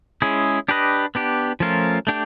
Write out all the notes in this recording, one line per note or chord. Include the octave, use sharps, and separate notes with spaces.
G#3 C#4 E4 G#4
D4 G4 B4 D#5
B3 D4 G4
F3 A3 C#4 F4 A#4
A3 D4 G4